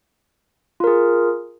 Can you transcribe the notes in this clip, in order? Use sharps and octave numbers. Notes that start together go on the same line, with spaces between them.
F4 G#4 A#4